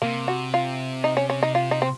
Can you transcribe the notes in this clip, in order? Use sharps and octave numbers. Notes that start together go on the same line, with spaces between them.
C3 A#3
F#4
F4
D#4
C#4
C#4
D#4
F4
D#4
C4